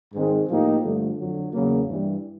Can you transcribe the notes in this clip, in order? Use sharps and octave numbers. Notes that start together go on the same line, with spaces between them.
G#2 D#3 G#3 C4
A2 F3 A#3 D#4 G4
G2 D3 F3 A3
F2 D3 F#3
E2 C#3 F#3 A#3
G2 E3 G3